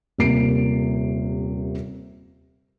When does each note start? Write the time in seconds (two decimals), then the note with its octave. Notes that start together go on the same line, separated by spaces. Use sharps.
0.18 D#1 C3 A#3 C7 D7